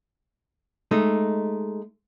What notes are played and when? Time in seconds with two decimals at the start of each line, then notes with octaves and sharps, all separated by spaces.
0.91 G#3 A3 D#4